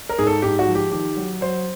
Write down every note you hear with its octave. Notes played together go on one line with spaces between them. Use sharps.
A#4
G#2 G#4
A4
G#2 G4
F#4
F3
G4
D#3 G4
F#3
F#3 C5